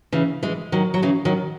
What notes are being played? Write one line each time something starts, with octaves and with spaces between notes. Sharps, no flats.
C#3 E3
E3 G#3
D#3 F#3
F#3
C#3 E3
D#3 F#3